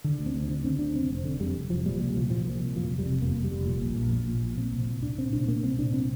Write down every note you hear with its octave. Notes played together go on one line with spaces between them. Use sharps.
D3
D2
C4
D2
D3 D4
D3 C4
D2 D4
F1 C4
F1
D3
F2 G3
F1
F1 F3
A#2 G3
C2 G3
C2 F3
A#2 F3
A#2
C2
F1 F3
F1
G3
C3
F2 A#3
F1
G3
F1
A#2
A#1
A#1
A#2
A#2
A#1
A#2 C4
C2
C2
A#2 D4
A#2 C4
C2 D4
A#2 A#3
C2 C4
C2 D4
A#2 C4